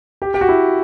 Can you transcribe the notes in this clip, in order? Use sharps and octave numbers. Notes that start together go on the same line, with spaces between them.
G4
G4
F#4
E4